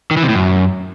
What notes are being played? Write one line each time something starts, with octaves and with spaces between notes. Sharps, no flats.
D#3
E3
C3
A2
F#2